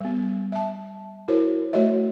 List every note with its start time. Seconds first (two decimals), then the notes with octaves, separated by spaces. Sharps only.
0.01 G3 B3
0.52 E5 A5
1.28 E4 F#4 A#4 C5 C#5
1.73 A3 F#4 C#5 D#5 E5